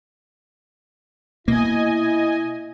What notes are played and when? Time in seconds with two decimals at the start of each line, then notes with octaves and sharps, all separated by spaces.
1.48 B2 A#3 E4 D#5 G#5